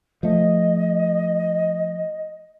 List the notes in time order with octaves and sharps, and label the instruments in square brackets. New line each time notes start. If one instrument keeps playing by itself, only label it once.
[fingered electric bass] F3 A3 [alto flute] D#5